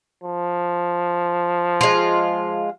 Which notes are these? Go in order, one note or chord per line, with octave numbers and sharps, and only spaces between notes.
F3
G#3 F4